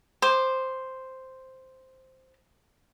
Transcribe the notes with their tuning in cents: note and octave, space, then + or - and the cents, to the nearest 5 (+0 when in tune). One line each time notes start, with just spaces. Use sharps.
C5 +0 D6 +25